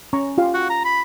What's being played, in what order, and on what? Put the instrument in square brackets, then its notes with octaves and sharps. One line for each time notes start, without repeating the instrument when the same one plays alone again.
[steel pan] C#4 A#5 C#6
F4 G4 F5
[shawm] F#4
A#5
B5